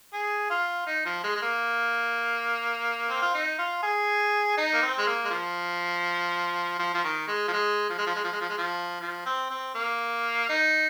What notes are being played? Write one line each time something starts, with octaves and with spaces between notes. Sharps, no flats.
G#4
F4
D#4
F3
G#3
G#3
A#3
C4
F4
D#4
F4
G#4
D#4
A#3
C4
G#3
A#3
G#3
F3
F3
F3
D#3
G#3
F3
G#3
F3
G#3
F3
G#3
F3
G#3
F3
G#3
F3
F3
C4
C4
A#3
D#4